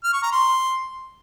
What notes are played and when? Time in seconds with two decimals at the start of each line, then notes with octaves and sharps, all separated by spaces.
0.04 F6
0.13 C#6
0.23 A#5
0.32 C6